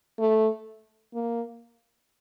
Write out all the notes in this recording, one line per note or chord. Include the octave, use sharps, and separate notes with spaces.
A3
A#3